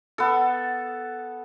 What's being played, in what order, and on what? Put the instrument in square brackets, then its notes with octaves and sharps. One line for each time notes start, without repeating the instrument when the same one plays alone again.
[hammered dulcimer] B3 A4